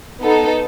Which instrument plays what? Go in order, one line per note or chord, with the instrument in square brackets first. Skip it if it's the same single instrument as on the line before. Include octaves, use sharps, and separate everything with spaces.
[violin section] B3 D#4 A4